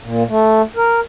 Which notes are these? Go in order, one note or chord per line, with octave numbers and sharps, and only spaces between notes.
A#2
A3
A#4